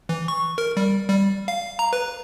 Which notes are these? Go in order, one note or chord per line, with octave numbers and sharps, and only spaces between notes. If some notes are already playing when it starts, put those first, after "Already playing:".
E3
C#6
A#4
G3
G3
F5
A#5
B4